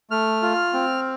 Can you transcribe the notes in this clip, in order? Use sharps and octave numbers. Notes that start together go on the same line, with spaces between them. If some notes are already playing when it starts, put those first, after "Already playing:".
A3 F6
F4
C4